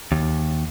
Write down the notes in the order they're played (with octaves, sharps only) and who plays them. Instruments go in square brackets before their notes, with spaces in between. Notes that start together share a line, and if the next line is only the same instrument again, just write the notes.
[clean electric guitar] D#2